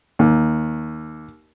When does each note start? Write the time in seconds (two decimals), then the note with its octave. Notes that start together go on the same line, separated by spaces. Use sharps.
0.19 D#2